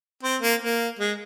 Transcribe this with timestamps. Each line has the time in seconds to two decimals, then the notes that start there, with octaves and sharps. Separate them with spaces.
0.23 C4
0.42 A#3
0.62 A#3
0.99 G#3